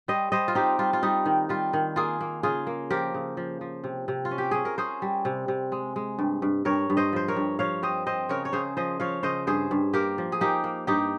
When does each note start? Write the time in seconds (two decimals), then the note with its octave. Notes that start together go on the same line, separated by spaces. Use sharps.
0.08 G3 C5 D#5
0.32 G3 C5 D#5
0.48 F4
0.55 C4 D#4 G4
0.79 G3 F4
0.93 F4
1.03 G3 D#4
1.26 D#3
1.49 G3 F4
1.73 D#3
1.96 A#3 F4 G#4
2.21 A#3
2.43 C#3 F4 G#4
2.67 A#3
2.90 F3 G4 A#4
3.14 C#3
3.37 F3
3.61 F3
3.84 C3
4.08 C3
4.25 F4
4.31 C#4
4.38 G4
4.51 C#4 G#4
4.65 A#4
4.78 C#4 G#4 C5
5.02 G3
5.25 C3
5.48 C3
5.72 G#3
5.96 G#3
6.19 G2
6.42 G2
6.65 G2 A#4 C#5
6.90 G2
6.97 C5 D#5
7.13 F3 C5
7.28 A#4 C#5
7.36 G2
7.59 F3 C#5 F5
7.82 C4 C5 D#5
8.06 C4 C5 D#5
8.29 C#3 A#4 C#5
8.45 C#5
8.53 C#3 G#4 C5
8.77 F3 C5 D#5
9.00 F3 C#5 F5
9.23 C#3 C5 D#5
9.47 G2 G#4 C5
9.71 G2
9.93 A#3 G4 A#4
10.18 F3
10.32 G#4
10.41 A#3 D#4 G4
10.64 A#3
10.87 G2 D#4 G4